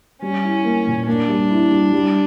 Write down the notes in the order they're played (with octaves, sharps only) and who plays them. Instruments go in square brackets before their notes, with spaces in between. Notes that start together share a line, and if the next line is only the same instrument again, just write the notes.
[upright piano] G3 [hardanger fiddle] C#4
[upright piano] E4
A#3
A#2
[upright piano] A#3 [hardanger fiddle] D4
[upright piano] G3
E4
G3
G3